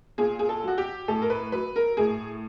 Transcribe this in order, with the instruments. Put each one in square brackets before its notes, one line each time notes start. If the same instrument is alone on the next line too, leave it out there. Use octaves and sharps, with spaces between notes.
[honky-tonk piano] A#2 G#4
G#4
A4
F#3 F#4
G4
A2 A4
A#4
B4
F#3 B4
A#4
A2 G#4